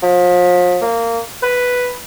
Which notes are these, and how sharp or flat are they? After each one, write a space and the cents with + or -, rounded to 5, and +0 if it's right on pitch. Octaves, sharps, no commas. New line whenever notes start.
F3 +35
A#3 -20
B4 +0